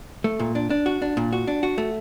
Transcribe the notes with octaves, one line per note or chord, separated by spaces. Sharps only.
A3
A#2
D4
D4
F#4
D4
A#2
F#4
D4
F#4
A3